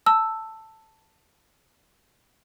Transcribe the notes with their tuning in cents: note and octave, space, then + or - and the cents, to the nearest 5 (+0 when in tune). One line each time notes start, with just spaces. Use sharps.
A5 +10 E6 +0